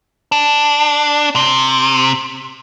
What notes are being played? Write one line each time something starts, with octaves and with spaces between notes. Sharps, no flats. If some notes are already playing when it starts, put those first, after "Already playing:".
D4
C3